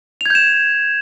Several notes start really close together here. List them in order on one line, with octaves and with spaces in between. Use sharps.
F7 G#6 G6 E7